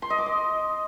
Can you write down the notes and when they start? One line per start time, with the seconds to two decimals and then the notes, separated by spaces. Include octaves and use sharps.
0.02 C6
0.10 D#5
0.18 D6
0.26 D#5